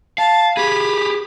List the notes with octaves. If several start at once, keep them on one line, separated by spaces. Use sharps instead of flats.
F5 A5
G4 G#4 B5